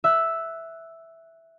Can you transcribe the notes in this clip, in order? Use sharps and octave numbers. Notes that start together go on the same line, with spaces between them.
E5 E6 F#6